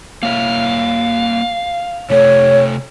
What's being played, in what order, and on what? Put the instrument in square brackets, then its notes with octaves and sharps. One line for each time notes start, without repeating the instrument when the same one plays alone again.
[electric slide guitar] A#3 C#5 E5 [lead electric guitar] F5
[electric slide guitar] C3 A3 A4 [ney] C#5